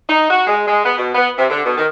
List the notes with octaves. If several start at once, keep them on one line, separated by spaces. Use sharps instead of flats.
D#4
F#4
G#3
G#3
B3
B2
B3
C3
D3
B2
D#3